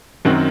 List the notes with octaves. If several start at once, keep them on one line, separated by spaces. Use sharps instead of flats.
F#2 D#3 F#3 C4 F#4